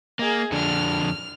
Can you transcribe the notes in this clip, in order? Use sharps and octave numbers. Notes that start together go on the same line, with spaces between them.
A#3 G#4 D#5
F2 D3 D4 F6